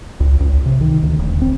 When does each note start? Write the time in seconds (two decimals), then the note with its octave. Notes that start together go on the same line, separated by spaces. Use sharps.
0.20 C#2
0.40 C#2
0.66 C3
0.81 D#3
1.03 D2
1.19 D#1
1.42 C4